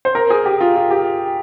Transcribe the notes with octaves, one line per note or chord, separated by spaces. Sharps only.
C5
A#4
G#4
G4
F4
F4
G4